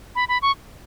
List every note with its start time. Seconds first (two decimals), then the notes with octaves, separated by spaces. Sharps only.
0.15 B5
0.28 B5
0.42 C#6